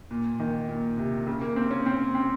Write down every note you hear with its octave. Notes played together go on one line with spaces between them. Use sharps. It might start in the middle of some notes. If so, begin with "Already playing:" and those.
A#2
D#3
A#2
C3
C#3
A#3
C4
C#4
C4
C4